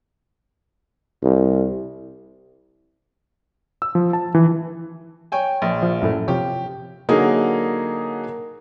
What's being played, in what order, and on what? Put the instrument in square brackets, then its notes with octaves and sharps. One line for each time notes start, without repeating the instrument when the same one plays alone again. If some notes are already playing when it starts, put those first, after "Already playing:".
[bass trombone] C2
[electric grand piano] E6
F3
A5
E3
[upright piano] C#5 G5 G#5
A#1
[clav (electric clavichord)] F3
F#2 A2 A3
[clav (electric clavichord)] C3 F3 C#5 [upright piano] G4
[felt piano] D3 F#3 A#3 D#4 G#4